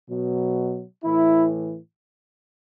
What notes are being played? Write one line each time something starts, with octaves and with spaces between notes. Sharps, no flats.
B2 F#3
A2 E3 E4